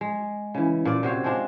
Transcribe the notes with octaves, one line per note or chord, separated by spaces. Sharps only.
G#3
C#3 E3
A#2 F4 D5
C3 F#4 C5 C#5
G#3 C4 D4 F4